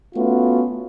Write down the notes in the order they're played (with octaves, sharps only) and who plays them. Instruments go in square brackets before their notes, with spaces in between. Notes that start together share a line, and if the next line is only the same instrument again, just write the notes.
[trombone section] A3 B3 C#4 F4 F#4